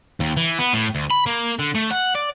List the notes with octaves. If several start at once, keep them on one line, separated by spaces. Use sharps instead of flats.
D#2
E3
B3
A2
D2
B5
A#3
D3
A3
F#5
D5